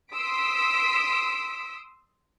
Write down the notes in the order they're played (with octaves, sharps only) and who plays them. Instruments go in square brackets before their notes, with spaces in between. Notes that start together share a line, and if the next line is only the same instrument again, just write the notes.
[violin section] C6 D#6 E6 B6 D7